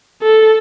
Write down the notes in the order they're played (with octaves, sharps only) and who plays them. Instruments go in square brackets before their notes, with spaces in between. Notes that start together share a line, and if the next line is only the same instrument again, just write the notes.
[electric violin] A4